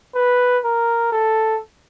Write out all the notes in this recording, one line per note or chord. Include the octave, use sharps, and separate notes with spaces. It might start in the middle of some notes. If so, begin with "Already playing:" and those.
B4
A#4
A4